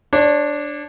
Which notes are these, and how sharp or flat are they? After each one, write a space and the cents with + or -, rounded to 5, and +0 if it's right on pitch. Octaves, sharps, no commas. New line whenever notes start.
D4 +0 C#5 -30